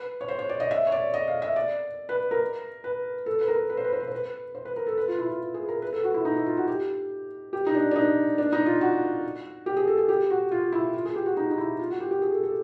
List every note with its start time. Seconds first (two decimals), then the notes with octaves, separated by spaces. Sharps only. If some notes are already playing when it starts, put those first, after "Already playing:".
Already playing: B4
0.21 C#5
0.28 C5
0.39 C#5
0.49 D5
0.60 D#5
0.71 E5
0.87 C#5
0.92 D5
1.14 D#5
1.28 F5
1.42 E5
1.56 D5
2.09 B4
2.31 A#4
2.84 B4
3.26 A4
3.41 B4
3.48 A#4
3.70 B4
3.77 C5
3.85 B4
3.92 C5
4.00 B4
4.07 C5
4.15 B4
4.55 C5
4.65 B4
4.76 A#4
4.87 A4
4.97 B4
5.08 F4
5.18 E4
5.29 F4
5.54 G#4
5.68 A#4
5.82 B4
5.93 A4
6.04 F#4
6.14 E4
6.25 D#4
6.36 E4
6.46 F4
6.57 F#4
6.67 G4
7.53 G4
7.67 D#4
7.75 D4
7.91 D4
7.96 D#4
8.38 D4
8.52 D#4
8.66 F4
8.81 F#4
9.66 G4
9.77 G#4
9.87 A4
9.98 G#4
10.08 G4
10.30 F#4
10.51 F4
10.72 E4
10.94 F4
11.05 G#4
11.16 G4
11.26 F#4
11.37 D#4
11.51 D#4
11.58 E4
11.79 F4
11.90 F#4
12.00 G4
12.11 G4
12.22 G#4
12.32 A4
12.43 A4